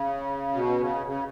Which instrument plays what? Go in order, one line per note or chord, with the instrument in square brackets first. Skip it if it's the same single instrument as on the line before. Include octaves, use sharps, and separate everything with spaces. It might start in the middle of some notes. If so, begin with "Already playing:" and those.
Already playing: [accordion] C#3
B2
C#3
C#3